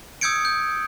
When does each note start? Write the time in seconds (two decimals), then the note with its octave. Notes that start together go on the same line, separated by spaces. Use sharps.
0.21 D#6 E6 G6 G#6 C#7 D7
0.45 G6